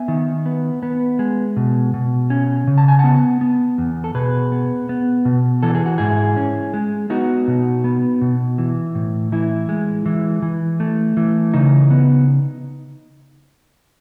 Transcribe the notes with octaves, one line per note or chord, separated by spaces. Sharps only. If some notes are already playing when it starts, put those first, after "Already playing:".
Already playing: B3 E5 G#5
D#3
B3
B3
G#3
B2
B2
C#4
C#3
A5
G#5
B3 F#5 A5
B3
E2
A4
B2 G#4 B4
B3
B3
B2
E3 A4
G#4
F#4
G#2 E4 G#4
C#4
G#3
B3 D#4 F#4
B2
B3
B2
E3
A2
E3 E4
G#3
E3
E3
A3
E3
C#3 D#4
B3